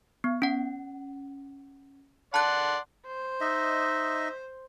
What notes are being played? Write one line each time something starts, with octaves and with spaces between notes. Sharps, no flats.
B3
C#4 F#5
D5 F#5 A5 C6 F#6
C5
D#4 D#5 E5